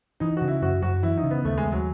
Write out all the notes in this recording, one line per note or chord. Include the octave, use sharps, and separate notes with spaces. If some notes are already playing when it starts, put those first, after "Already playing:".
E3 D#4
C#3 F#4
E4
F#2 F#4
F#2 F#4
E3 E4
D#4
C#3
B3
D#2 A3
G#3
D#2
F#3